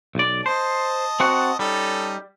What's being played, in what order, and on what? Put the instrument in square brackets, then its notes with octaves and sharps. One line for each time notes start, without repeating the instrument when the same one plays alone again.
[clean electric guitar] B1 D5
[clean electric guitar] C5 [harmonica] D#5 A5
[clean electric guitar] C4 F#4 F#5
[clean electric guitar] G3 [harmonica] C#4 D#4 A4